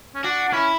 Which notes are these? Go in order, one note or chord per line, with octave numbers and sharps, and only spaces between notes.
C#4
D4 F#4
D4
C#4 E4